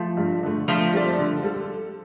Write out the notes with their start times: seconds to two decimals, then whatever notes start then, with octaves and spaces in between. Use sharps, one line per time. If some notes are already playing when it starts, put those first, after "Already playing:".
Already playing: F3 A3
0.17 G2
0.43 D3 A3
0.68 D3 F3 A3
0.93 G3 C4 A4 D5
1.19 D3
1.44 G3 A4